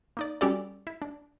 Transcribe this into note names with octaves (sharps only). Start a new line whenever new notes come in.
A#3 D#4 D5
G3 C#4 F#4 G4 A4 D5
E4
D4